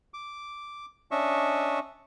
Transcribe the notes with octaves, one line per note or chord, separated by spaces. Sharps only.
D6
C#4 D4 D#5 E5 C#6